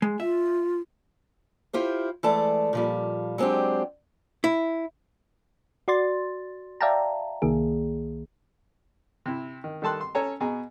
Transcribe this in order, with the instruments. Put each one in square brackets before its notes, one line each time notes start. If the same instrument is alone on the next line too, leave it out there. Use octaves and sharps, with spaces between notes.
[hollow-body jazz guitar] G#3
[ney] F4 [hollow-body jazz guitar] E5
[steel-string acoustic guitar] E4 F4 G4 C5
E3 G#3 A3 D5 A5
A#2 F3 G3
F#3 G#3 C4 D4 G4
[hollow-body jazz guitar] E4
[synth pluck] F#4 D5 C6 A6
D5 E5 F5 G5 A5 A#5
C2 D#3 A#3 G#4
[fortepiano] C3 E4
D#3
D#3 G3 A4 A5 C6 F#6
C6
C#4 A4 C#5 G#5 A#5
B2 G#4 G#5 A#5